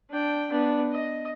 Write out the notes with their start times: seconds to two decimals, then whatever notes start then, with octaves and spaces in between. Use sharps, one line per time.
0.10 D4 G5
0.51 B3 D4
0.92 D#5